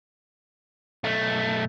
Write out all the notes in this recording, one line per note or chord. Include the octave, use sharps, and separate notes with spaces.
B1 A3